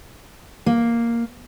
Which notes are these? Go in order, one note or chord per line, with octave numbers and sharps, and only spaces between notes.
A#3